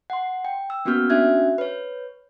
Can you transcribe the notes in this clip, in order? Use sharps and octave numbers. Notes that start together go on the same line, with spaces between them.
F#5 C6
G5
E6
A#3 B3 C#4 F#4 F6 G6
C#4 D4 F#4 E5 F#6 G#6
B4 C#5